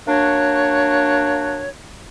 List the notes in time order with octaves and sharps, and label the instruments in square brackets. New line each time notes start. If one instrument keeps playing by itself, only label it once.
[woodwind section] A#3 D4 F#4 C#5